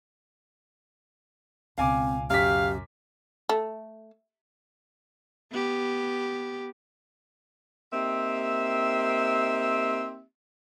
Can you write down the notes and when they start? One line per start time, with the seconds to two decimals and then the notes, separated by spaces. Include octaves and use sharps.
1.78 C#2 B2 C4 F5 G#5 D6
2.30 F#2 G4 F5 B6
3.49 A3
5.52 B3 G4
7.93 A#3 C4 D#4 G4 E5